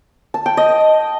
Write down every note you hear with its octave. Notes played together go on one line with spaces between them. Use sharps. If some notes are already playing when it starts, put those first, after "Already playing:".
A5
G5
D#5